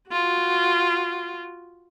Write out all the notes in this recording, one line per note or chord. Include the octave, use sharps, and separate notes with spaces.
F4 F#4